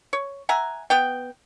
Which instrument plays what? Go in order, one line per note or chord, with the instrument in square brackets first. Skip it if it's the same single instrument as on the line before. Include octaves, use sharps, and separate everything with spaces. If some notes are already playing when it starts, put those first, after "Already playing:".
[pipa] C#5
E5 F#5 G#5 A#5
B3 G5